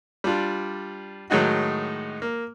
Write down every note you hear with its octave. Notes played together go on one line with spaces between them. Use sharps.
G3 D4 F4
A2 D#3 F#3 G#3 D#4 F#4
A#3